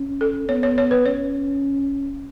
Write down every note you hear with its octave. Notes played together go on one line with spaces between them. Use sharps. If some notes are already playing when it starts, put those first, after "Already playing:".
Already playing: C#4
A4
B3 C#5
C#5
C#5
B4
C#4 C#5